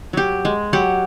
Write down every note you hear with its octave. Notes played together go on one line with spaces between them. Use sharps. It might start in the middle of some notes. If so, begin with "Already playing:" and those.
F#3 G4
G#3
F#3 G4 F#5